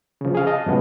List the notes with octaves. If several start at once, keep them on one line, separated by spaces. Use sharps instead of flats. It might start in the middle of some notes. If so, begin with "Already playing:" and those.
C#3 F3
G#4 F5
D#5 A5
F#2 C3 F3 G#3 A3 B3